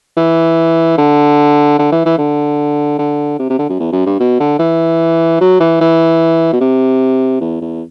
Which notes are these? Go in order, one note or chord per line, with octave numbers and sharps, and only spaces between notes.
E3
D3
D3
E3
E3
D3
D3
C3
C3
D3
F#2
E2
F#2
G2
B2
D3
E3
F#3
E3
E3
B2
C3
E2
E2